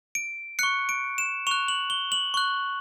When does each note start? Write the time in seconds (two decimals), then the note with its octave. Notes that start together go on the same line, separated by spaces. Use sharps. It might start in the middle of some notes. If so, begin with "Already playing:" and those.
0.15 D7
0.59 C#6 F#6 C#7
0.89 D7
1.18 E7
1.47 C#6 F#6 F7
1.68 F#7
1.90 G7
2.12 F#7
2.34 C#6 F#6